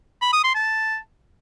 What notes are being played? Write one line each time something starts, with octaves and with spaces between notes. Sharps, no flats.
B5
D#6
C6
A5